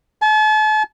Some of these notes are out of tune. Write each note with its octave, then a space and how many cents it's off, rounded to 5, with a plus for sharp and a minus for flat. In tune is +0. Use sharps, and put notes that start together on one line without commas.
A5 -40